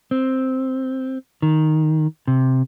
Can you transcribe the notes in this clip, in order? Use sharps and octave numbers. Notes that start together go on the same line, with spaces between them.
C4
D#3
C3